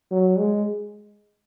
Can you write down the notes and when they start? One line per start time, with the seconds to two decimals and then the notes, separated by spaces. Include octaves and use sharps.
0.11 F#3
0.38 G#3